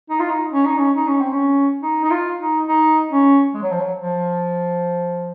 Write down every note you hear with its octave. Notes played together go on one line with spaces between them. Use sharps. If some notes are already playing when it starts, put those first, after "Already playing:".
D#4
F4
D#4
C#4
D#4
C#4
D#4
C#4
C4
C#4
D#4
D#4
F4
D#4
D#4
C#4
G#3
F#3
F3
F#3
F3